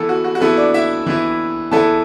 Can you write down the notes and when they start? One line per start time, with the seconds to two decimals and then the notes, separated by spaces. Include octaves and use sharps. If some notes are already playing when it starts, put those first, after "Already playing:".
Already playing: E3 B3 E4 A4
0.09 F#4
0.24 F#4
0.35 F#4
0.40 E3 B3 E4 A4
0.57 D4 D5
0.74 E4 E5
1.06 E3 B3 E4
1.71 E3 B3 E4 A4 A5